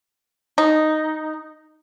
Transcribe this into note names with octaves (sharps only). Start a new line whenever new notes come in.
D#4